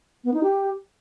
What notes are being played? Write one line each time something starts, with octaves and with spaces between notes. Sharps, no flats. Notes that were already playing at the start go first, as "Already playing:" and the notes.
B3
D#4
G4